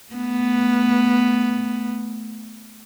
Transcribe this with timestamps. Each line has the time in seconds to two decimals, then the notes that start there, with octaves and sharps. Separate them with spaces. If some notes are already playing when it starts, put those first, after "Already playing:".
0.13 A3 B3